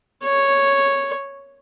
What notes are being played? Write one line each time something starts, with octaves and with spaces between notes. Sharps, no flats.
C#5